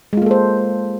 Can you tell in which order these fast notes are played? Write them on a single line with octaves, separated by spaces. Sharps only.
G#3 F4 A#3 A4 C5